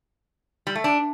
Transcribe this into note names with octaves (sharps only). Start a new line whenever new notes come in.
G3
A3
D4